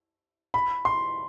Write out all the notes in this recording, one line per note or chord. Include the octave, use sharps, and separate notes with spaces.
B5
C6